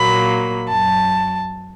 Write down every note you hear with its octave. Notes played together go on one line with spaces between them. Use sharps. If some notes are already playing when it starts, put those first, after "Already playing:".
Already playing: A#2 F#3 A#3 B5
F#2 A5